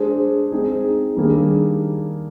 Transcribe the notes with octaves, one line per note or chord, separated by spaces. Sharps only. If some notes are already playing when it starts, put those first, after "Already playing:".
Already playing: G#3 D4 G#4 C5
G#3 C4 D#4 G#4
D#3 G3 A#3 D4 G#4